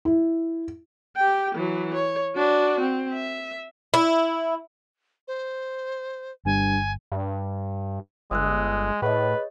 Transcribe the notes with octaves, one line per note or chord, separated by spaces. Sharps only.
E4
G4 G5
E3 F#3
C#5
D4 F#4
C4
E5
E4
C5
G1 G2 G#5
G2
G1 G#3 D#6 E6 F#6
A2 G#4 B4 C#5 D#5